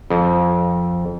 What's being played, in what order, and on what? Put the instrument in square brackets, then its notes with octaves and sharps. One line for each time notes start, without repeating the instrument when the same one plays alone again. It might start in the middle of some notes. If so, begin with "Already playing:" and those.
[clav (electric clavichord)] F2